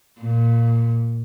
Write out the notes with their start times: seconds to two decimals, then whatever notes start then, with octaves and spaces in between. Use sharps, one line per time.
0.20 A#2